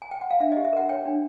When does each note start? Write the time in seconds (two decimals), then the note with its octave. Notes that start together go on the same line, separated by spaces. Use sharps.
0.02 G#5
0.11 G5
0.21 F#5
0.31 F5
0.40 D4 E5
0.52 D#5
0.57 G4
0.65 E5
0.73 A#4 F#5
0.89 C#5 G5
1.05 D4